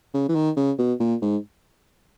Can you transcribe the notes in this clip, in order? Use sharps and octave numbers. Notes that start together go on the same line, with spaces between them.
C#3
E3
D#3
C#3
B2
A#2
G#2